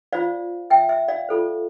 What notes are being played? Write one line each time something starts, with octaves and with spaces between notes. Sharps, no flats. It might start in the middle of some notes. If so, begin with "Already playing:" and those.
F4 C5 D5 F5
E5 G5
E5
D5 F5
F4 A4 C5